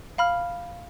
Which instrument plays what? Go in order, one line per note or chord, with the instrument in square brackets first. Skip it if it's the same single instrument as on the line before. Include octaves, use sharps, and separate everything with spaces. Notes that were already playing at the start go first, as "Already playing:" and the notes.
[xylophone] F5 B5 F6